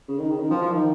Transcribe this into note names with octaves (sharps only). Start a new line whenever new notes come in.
C#3
D#3
C#3
D#3
F3
F3
D#3